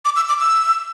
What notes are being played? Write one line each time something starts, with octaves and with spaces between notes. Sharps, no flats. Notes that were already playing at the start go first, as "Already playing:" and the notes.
D6
E6
D6
E6